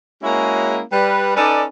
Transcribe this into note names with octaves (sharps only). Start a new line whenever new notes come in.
G#3 A#3 C#4 E4 F#4 G#4
G3 B4
C#4 D#4 A4 B4 D5